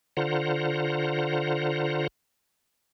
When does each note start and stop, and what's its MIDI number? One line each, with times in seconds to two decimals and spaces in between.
0.17 2.07 50
0.17 2.07 65
0.17 2.07 72
0.17 2.07 78
0.17 2.07 82